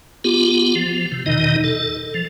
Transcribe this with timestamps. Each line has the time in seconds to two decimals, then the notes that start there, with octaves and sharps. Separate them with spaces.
0.24 B3 F4 G4
0.75 F3
1.12 C3
1.26 E2 B2 D#3 D#4 D#5
1.64 A4
2.14 F3